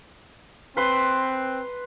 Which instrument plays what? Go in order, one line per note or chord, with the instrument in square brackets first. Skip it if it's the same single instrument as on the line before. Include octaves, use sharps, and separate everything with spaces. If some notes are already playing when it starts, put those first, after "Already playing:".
[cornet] C4 [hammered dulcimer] B4 C6